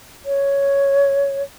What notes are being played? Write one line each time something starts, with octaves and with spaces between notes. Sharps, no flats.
C#5